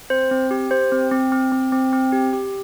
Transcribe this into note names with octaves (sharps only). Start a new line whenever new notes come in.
C4 C5
C4
G4
G4 C5
C4
C4
C4
C4
C4
C4
G4
G4